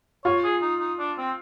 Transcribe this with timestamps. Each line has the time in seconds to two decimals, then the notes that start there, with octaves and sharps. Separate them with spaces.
0.25 F4 C#5
0.44 G#4
0.62 D#4
0.80 D#4
0.99 D4
1.18 C4